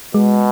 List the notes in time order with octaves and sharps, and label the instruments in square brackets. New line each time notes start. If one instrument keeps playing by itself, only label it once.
[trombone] B2 [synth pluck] G#3